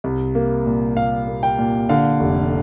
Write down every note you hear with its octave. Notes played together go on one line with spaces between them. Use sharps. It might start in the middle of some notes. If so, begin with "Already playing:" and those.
C2
A#3
A#2
A#2 F5
A#3
G5
A#2
D3 F5
F1